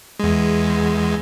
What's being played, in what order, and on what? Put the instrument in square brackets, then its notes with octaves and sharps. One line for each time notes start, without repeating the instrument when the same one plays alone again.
[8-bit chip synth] E2 G#3